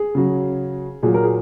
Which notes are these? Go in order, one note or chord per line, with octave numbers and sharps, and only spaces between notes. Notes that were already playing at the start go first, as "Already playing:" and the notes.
Already playing: G#4
C#3 F#3
A#2 F#3 G#4
A#4
G#4